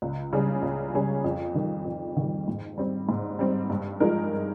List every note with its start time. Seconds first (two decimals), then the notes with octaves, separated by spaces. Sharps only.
0.02 C#2
0.33 C#3 G3 C#4 G#4
0.62 C#2
0.94 C#3 G3 C#4 G#4
1.24 F2
1.54 D#3 G3
1.85 F2
2.17 D#3 G3
2.48 G#2
2.78 G3 C4
3.09 G#2
3.39 G3 C4
3.70 G2
4.00 F3 G#3 D#4 A#4